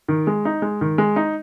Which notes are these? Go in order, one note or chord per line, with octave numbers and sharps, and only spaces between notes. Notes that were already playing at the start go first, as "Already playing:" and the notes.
D#3
G#3
D#4
G#3
D#3
G#3
D#4